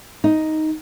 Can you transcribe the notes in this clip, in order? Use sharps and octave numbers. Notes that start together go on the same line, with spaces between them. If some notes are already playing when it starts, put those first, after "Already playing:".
D#4